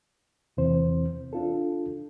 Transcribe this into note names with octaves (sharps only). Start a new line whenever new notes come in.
E2 C3 E3 C4 C5
D4 F4 A4